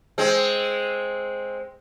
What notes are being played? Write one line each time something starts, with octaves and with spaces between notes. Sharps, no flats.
G#3 C4